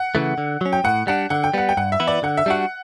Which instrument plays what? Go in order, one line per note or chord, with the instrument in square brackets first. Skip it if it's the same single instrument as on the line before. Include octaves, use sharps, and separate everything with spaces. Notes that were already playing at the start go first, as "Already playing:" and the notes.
Already playing: [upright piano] F#5
[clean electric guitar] C#3 E3 A3
D3
F#3 C#4
[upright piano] G5
[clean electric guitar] A2 [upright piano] F#5
[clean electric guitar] G3 D4 [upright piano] F#5
[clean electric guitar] D3 [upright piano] F#5
[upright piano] G5
[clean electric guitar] G3 B3 [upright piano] F#5
[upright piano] G5
[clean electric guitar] G2 [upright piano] F#5
[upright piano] E5
[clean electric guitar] E3 B3 E4
[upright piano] D5
[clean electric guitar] D3 [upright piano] F#5
[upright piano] E5
[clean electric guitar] G3 D4 F#4 [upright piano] F#5